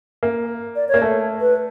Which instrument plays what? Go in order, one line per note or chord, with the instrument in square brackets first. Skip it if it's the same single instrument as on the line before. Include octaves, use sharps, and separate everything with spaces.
[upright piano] A#3
[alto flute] D5
C#5
[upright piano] A#3
A3
[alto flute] B4